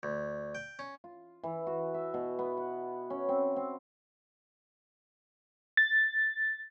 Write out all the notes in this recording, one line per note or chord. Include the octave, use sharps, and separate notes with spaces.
D2
G5
C#4
F4
E3
F#4
E5
B2
B3
F#5
C#4
C4
C4
A6